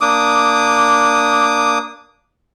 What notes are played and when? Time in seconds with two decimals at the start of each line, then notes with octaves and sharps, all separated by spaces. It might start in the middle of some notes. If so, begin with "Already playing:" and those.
0.01 A#3 D4 D6 D#6